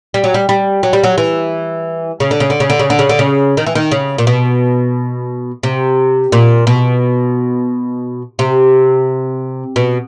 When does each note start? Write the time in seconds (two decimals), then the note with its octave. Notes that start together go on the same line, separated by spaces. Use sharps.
0.14 G3
0.24 F#3
0.34 G3
0.49 G3
0.83 F#3
0.93 G3
1.04 F#3
1.18 E3
2.20 C#3
2.31 D3
2.40 C#3
2.50 D3
2.60 C#3
2.70 D3
2.79 C#3
2.90 D3
2.99 C#3
3.09 D3
3.19 C#3
3.57 D#3
3.67 E3
3.75 D#3
3.91 C#3
4.18 A#2
4.27 B2
5.63 C3
6.32 A#2
6.67 B2
8.39 C3
9.76 B2